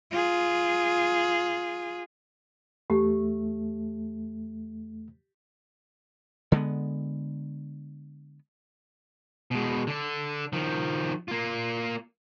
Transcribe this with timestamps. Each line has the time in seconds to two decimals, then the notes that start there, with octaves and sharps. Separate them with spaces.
0.11 F4 G#4
2.90 E2 A3 G4
6.52 D3 G#3 A#3 B3
9.51 B2 G#3
9.87 D3 A4
10.53 D#3 F3
11.28 A#3 F4